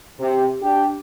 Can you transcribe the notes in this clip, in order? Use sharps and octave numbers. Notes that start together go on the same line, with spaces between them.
C3
D4 G4